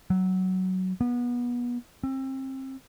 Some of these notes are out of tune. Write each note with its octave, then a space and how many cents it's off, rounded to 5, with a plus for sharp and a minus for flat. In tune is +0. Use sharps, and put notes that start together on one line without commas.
F#3 +10
B3 -25
C4 +30